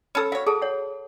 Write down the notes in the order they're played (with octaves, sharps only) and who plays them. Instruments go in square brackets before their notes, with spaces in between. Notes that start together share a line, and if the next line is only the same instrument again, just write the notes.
[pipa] C#4 A4 [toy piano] B5 E6
[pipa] F#4 C#5 [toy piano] F5
[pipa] F#4 [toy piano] G#4 A4 A5
[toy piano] C#5 F#5